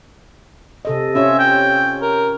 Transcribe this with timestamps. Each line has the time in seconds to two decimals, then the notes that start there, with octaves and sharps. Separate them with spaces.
0.85 C3 A4 D#5
1.15 C#4 F4 C#5 E5
1.39 G5
2.02 A#4